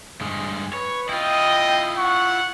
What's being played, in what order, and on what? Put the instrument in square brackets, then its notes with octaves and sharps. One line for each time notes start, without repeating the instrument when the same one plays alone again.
[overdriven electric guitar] G2 G#3 [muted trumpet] G#4
[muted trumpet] B4 [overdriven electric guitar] C#5
[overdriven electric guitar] E4 F4 [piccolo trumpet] D#5 [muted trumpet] G5
[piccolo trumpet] F#5 [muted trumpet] C#6